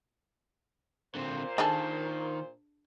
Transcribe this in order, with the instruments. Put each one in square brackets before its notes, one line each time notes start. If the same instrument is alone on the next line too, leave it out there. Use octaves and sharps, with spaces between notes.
[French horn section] A#2 C5 [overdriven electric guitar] D3 C4
[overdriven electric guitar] D#3 [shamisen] D4 G#4 A4